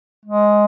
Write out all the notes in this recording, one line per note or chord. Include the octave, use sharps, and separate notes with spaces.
G#3